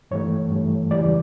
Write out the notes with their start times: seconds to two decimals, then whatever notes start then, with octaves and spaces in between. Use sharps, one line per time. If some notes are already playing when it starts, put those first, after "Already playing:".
0.11 G2 E3 A3 C#5
0.51 G2 E3 A3
0.91 E2 C#3 E3 G3 D5